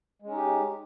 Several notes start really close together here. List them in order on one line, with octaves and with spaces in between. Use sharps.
G#3 C#4 D#4 G4